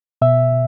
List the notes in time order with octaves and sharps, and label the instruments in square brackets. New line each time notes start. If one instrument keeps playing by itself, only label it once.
[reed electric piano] B2 E5